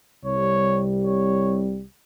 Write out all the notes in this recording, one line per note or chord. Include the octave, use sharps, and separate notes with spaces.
C2 C3 G3 C#5
C#5